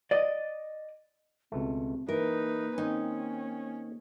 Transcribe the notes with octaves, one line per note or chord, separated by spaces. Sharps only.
D5 D#5
C#2 B2 A3 C4
E3 A#3 D#4 A#4 B4
D#3 C4 C#4 D#4